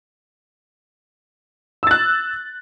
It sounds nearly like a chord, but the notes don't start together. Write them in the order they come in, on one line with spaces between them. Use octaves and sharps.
E6 A6 F#6